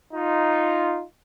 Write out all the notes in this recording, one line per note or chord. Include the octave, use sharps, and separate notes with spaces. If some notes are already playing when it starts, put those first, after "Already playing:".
D#4 F4